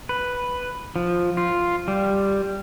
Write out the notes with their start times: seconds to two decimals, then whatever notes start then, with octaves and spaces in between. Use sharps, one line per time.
0.09 B4
0.96 F3
1.37 F4
1.88 G3